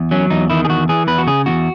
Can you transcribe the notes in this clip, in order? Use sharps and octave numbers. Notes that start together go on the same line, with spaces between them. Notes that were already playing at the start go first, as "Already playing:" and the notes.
Already playing: E2
F#3 C#4
E2 D#4
D#3 E4
G#4
E2 F#4
E3 G#4
E2 B4
F#4
C#3 G#4
E2 F#4